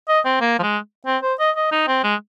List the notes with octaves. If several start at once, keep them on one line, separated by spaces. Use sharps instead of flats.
D#5
C4
A#3
F3
G#3
C4
C5
D#5
D#5
D#4
C4
G#3